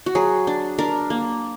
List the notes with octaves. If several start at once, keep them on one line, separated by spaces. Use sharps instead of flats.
F#4
F#3 G#4
D4
D4 A#4
A#3